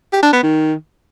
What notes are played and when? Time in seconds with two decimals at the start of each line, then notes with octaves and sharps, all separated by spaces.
0.13 G4
0.23 D4
0.33 B3
0.43 D#3